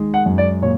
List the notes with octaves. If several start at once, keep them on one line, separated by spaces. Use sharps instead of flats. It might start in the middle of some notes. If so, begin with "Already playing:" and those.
Already playing: D#3 G#3
F#5
F#2
D5
A#2 C#5